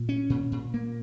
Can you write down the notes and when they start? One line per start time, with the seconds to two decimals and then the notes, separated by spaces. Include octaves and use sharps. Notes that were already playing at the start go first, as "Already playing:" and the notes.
Already playing: A#2
0.09 C#4
0.30 A#2
0.52 A#2
0.74 A#3